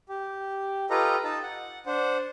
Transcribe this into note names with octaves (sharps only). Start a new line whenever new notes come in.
G4
F4 G4 A4 B4 D#5 A#5
D#4 A5
F#5
D4 C5 F#5